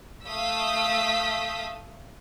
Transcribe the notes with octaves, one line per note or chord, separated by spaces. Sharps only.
A3 F5 D#6 E6 G6 B6